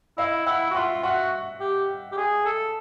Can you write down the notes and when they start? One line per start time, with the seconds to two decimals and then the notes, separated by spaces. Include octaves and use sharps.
0.18 E4 D#5 F5
0.46 E4 E5 F#5
0.71 F#4
0.75 F4 E5 F#5
1.03 F#4 E5 F#5
1.60 G4
2.12 G4
2.17 G#4
2.46 A4